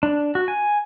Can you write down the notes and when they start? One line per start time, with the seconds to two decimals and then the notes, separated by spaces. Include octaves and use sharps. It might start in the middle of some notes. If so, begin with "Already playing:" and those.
0.03 D4
0.35 F#4
0.48 G#5